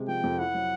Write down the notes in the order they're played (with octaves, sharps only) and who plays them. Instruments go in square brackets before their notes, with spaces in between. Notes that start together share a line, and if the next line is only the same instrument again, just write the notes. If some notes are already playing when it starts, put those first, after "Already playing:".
Already playing: [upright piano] C3 G#3
[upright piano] F3 [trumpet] G5
[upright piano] F2
[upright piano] E4 [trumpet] F#5
[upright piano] F#3